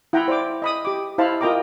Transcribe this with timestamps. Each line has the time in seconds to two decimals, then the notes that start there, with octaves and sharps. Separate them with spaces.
0.13 E4 F#5 G5 A#5 B5
0.28 C5 D5 D6
0.62 D#5 B5 D#6
0.85 G4 D6
1.18 E4 C5 D#5 F5 A5 B5
1.41 F4 A#4 D#5 G5 A#5 D6